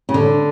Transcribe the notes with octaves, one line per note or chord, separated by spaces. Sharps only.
C#3
D3